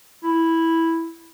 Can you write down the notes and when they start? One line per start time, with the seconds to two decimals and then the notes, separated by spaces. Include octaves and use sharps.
0.24 E4